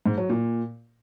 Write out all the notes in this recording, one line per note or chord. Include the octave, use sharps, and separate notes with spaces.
G#2
F#3
A#2